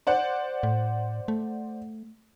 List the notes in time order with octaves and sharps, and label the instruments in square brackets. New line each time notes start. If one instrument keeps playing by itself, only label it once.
[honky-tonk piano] C5 D5 F#5
[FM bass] A2
A3